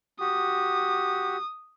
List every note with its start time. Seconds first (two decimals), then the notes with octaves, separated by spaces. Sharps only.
0.20 F#4 G4 D#6